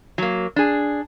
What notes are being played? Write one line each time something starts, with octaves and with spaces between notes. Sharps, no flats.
F#3 A#3
D4 G#4